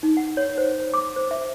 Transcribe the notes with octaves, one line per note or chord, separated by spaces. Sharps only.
D#4
F#5
C#5
C5
D6
C5
E5